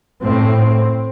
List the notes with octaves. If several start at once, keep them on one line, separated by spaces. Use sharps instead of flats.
A2 C4